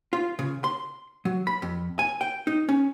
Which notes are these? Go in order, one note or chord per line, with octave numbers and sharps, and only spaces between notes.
F4
C#3
C6
F#3
B5
F2
G#5
G5
D#4
C#4